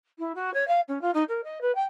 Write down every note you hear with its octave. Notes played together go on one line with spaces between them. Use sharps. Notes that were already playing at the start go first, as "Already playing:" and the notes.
E4
F#4
C#5
F5
C#4
F4
D#4
A#4
D#5
B4
G5